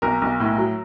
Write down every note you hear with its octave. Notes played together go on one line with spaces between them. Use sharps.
B1 A#4
B1
A2
F#3